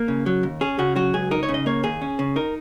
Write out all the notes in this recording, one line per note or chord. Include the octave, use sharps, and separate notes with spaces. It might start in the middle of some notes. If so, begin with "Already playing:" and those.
Already playing: A#3 A#4
C#3
F#3
D#2
C#4 G#4
C#3 F#4
F#3 F#4
C#2 G#4
D#4 A#4
C#5
C#3
D#5
A#3 C#5
D#2 G#4
C#4
C#3
D#4 A#4